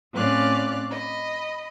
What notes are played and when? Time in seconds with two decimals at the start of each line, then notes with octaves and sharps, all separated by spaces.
0.13 A2 C4 C#4 D5 F5 F#6
0.90 D#5 B5